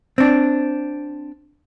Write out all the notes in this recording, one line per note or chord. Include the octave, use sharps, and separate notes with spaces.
C4 D4